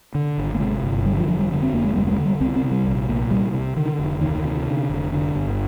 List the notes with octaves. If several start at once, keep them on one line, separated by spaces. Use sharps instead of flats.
D3
G#1
A#3
C3 G#3
G1
D3 G3
F3
F1 F3
G3
D3
C4
F1 A#3
G#3
D2 G3
A#3
G#3
D3
G3
C2 C4
C4
C3
G3
A#1
A#2
C2 G3
C3
D3 D#3
F1
D2 D#3
C3
D3
F1
D3
G1